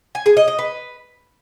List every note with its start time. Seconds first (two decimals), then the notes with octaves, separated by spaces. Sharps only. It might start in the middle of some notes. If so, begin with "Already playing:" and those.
0.15 G#5
0.26 G#4
0.37 D#5
0.48 D#5
0.59 B4